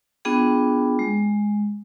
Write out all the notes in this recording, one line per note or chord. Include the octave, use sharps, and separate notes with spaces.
B3 D4 F4 G#4 G5
G#3